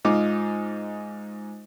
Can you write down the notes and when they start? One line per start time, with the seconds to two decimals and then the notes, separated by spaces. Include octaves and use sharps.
0.05 G#2 D#4 F4 D6